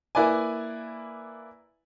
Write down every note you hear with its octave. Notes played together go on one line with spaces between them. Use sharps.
A#3 E4 B4 D5 G#5